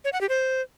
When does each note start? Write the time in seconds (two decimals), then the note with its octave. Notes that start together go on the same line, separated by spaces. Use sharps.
0.04 C#5
0.13 F#5
0.21 G4
0.29 C5